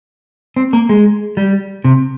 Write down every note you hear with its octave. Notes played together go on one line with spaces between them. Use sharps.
C4
A#3
G#3
G3
C3